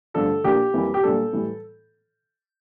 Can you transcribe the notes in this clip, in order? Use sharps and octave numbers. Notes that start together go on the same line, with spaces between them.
G2 D3 F3 A3 D4 A4
A#2 F3 A#3 D4 G4
F2 E3 G3 A#3
G4
A#2 G3 D4 A4
A2 E3 G3